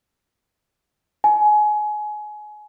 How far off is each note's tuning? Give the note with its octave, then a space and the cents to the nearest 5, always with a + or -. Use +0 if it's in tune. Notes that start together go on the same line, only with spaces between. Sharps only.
G#5 +25